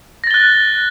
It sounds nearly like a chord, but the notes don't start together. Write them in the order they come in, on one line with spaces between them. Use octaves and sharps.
A#6 A6 G7 F#6